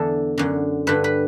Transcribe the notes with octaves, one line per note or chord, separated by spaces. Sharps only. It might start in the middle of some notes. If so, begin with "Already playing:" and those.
Already playing: E2 D3 A4
F#2 D3
G2 D3 B4
B4